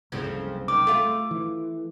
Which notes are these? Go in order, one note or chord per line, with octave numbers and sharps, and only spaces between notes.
F#1 C2 F2 C#3 F3
D#3 D6
A3 F4
E3